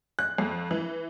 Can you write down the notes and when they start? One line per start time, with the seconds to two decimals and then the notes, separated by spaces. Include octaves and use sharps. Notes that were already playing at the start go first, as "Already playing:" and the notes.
0.19 F#6
0.38 F2
0.71 E3